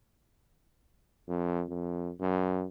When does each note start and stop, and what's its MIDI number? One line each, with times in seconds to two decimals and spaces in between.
1.28 1.64 41
1.69 2.11 41
2.21 2.66 42